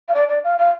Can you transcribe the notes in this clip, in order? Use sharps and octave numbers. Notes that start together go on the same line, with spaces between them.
F5
D5
D5
F5
F5